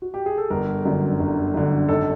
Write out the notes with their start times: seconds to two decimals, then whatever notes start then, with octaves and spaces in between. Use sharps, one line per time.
0.02 F#4
0.14 G4
0.26 G#4
0.38 A4
0.50 G1 A#4
0.85 F#2 D3
1.20 G1
1.54 F#2 D3
1.88 G#1 A4